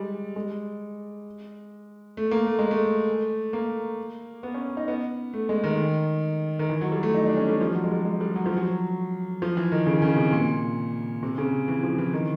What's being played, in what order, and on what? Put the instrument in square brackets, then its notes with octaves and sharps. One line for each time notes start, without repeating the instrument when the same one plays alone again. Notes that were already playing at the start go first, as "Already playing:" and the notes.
Already playing: [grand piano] G3 G#3
G#3
A3
A#3
A3
G#3
A3
A#3
B3
C#4
D#4
B3
A3
G#3
D#3
D#3
E3
F#3
G3
A3
D#4
D4
C#4
G3
F3
F#3
G#3
G3
G#3
G3
F#3
F3
F#3
F3
E3
D#3
C#3
C#3
C3
A#2
C3
C#3
E3
F3
E3
D#3